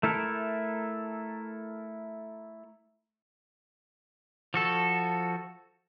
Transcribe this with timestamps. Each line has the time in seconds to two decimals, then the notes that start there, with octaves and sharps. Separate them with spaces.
0.03 A3 E4 A4 A#4
4.54 F3 F#4 A4